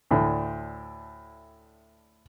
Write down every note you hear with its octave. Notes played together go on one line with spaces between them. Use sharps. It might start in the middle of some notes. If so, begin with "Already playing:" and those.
D2 A2 D3